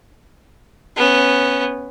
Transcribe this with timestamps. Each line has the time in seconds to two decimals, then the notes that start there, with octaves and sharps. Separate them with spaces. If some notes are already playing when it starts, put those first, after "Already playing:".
0.96 B3 C#4